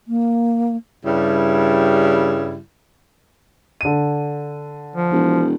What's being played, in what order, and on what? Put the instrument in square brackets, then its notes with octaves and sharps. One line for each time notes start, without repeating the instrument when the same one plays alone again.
[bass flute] A#3
[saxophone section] G2 C#3 G3 E4
[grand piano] D3 D#7
[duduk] F3
[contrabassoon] E1